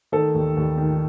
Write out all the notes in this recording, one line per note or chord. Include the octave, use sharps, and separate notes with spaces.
D#3 A4
D#2
D#2
D#3